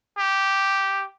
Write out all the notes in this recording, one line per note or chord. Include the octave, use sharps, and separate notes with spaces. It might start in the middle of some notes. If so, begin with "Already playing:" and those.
G4